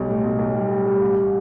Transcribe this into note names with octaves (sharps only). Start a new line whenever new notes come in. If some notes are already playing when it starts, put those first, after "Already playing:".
Already playing: B1 G3
A2
B1
B1
G3
G3
G3
A1